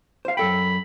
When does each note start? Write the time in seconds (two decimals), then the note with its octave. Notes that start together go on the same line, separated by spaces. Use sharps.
0.25 C5 F5
0.37 F#2 A4 G5 B5